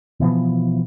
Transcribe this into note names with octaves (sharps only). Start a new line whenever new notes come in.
B2 E3 F3 B3